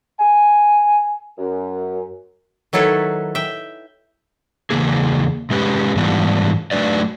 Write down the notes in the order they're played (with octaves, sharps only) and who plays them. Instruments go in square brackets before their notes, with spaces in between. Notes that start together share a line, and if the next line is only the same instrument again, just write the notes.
[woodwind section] G#5
F#2
[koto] D#3 F#3 E4 A4 B4 C#5
E5 G5
[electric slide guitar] E2 C#3 A#3 G#4
C3 G#3 C#4 G4 B4
G#2 E3 G3 B3 D4 F4
F#3 A3 D4 B4 D5